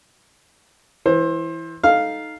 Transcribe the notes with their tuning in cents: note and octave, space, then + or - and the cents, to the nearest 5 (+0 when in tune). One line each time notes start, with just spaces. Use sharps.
E3 +0 C5 +25
D#4 +0 A4 -10 F5 +0